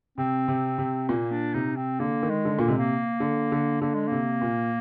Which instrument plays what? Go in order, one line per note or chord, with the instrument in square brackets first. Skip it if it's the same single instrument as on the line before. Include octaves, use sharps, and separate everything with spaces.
[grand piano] C3 [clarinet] C4
[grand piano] C3
C3
[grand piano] A#2 [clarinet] A#3
[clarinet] D4
[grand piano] C3 [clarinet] D#4
[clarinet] C4
[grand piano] D3 [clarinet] A#3
[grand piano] D#3
[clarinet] G#3
[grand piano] D3
[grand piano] A#2 [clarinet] A#3
[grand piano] C3 [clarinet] G#3
[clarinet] A#3
[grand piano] D3
D3
[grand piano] D3 [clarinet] A#3
[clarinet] G#3
[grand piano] C3 [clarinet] A#3
[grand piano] A#2